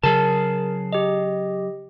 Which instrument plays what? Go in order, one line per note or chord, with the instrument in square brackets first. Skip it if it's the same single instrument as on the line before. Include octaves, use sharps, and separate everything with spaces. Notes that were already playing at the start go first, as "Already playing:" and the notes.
[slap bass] C#3 F#3 [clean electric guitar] G#4 A5 [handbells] A#4
[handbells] G4 D#5